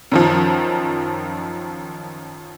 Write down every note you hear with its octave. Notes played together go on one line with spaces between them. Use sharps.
F#2 D#3 F3